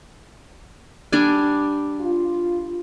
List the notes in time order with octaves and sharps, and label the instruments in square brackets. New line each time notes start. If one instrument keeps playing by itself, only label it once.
[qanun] G3 D4 G#5
[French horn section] F4